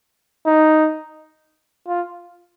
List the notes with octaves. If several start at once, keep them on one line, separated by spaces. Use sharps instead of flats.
D#4
F4